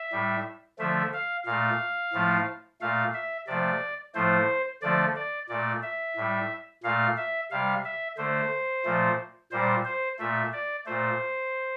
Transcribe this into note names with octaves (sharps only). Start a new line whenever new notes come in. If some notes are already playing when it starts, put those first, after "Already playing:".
Already playing: E5
A2 G3
D3 F3 A3 E5
F5
A#2 A3 F5
A2 F3 A3
A#2 A3 F5
E5
C3 F3 A3 D5
A2 F3 A3 C5
D3 F3 A3 D5
D5
A#2 A3 D5
E5
A2 G3
A#2 A3 F5
E5
C3 G3 F5
E5
D3 A3 C5
A#2 F3 A3
A#2 G3 C5
C5
A#2 A3 E5
D5
A#2 A3 C5